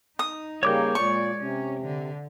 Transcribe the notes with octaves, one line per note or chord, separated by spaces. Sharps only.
D#4 D#6
C#3 G3 A#3 C#5 D6 G6
A#2 G#3 D5 C#6
C3 C#4
D3